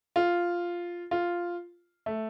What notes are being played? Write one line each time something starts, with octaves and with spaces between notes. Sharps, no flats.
F4
F4
A3